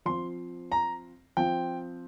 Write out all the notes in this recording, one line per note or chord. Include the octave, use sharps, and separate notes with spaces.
F3 C4 F4 C6
A#5
F3 C4 F4 G5